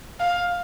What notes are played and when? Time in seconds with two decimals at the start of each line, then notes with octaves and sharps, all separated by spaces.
0.20 F5